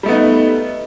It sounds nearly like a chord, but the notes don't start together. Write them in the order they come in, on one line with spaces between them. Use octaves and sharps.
G3 A3 B3 D#4